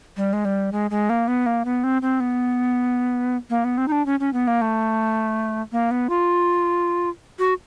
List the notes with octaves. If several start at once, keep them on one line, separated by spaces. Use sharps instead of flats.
G3
G#3
G3
G#3
G#3
A#3
B3
A#3
B3
C4
C4
B3
A#3
B3
C4
D#4
D4
C#4
C#4
B3
A#3
A3
A#3
B3
F4
F#4